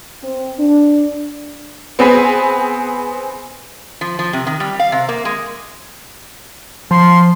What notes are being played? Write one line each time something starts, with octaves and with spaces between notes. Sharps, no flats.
C4
D4
B3 C4 G#4 B4
F3
F3
C3
D#3
G3
F5
C3
A#3
G#3
F3 C6